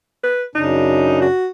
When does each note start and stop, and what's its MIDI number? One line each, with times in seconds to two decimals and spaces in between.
0.23 0.43 71
0.55 1.27 42
0.55 1.27 49
0.55 1.27 62
0.55 1.21 63
1.21 1.48 66